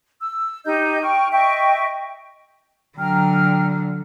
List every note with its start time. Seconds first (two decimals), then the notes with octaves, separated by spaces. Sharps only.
0.21 E6
0.65 D#4 G4 D#5 G6
1.02 G5 C#6 F6
1.32 D#5 E5 G5 C#6
2.98 D3 F#3 G5 A#5 F6